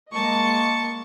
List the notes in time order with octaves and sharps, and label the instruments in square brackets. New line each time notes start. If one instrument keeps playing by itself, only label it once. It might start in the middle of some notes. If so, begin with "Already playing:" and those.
[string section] G#3 A#3 D#5 [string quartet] A5 C#6